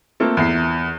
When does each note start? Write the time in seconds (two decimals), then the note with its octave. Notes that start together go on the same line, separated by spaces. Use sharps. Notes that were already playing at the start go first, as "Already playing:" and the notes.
0.20 A3 A#3 C4 F4 A4
0.37 E2 E4 C7